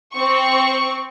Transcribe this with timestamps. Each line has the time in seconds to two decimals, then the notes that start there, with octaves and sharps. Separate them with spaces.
0.14 C4 C#6